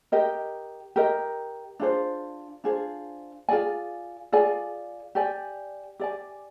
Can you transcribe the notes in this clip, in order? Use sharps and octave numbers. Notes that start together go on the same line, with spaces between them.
G4 A#4 D#5
G4 A#4 D#5
D4 F4 G#4 C5
D4 F4 G#4 C5
F4 G#4 D5 G#5
F4 G#4 D5 G#5
G4 D5 G#5
G4 D5 G#5